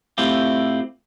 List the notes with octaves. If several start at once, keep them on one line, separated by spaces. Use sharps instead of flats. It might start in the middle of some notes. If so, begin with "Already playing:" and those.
A2 A3 C4 E4 F4 G4